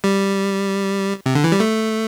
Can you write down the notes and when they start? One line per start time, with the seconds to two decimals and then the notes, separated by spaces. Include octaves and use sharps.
0.04 G3
1.26 C3
1.35 D3
1.44 E3
1.52 G3
1.60 A3